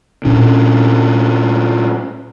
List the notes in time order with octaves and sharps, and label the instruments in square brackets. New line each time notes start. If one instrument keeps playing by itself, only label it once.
[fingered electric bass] A#2 C#4 D4